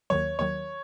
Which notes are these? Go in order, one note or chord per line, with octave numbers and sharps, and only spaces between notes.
D#2 D#3 F#3 C#5
D#2 D#3 F#3 C#5